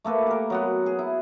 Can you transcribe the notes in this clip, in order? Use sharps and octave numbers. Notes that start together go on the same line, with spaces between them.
A3 A#3 A4 B4
G4 A#4
F#3 B3 F#5
G#4
E4